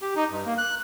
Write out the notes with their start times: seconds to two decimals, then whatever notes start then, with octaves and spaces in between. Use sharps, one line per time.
0.02 G4
0.16 D#4
0.30 G2
0.46 A#3
0.58 F#6